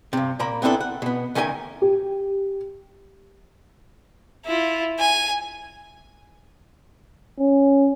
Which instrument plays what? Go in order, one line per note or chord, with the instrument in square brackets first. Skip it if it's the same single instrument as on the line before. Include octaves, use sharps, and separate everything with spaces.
[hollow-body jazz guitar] G2 C3
A#2 A#3 A#5 B5
B3 C4 D4 E4 A4
F#5
B2 B3
D2 D#3 C#4 A#4 D5 G#5
[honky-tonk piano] G4
[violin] E4 F4
G#5
[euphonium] C#4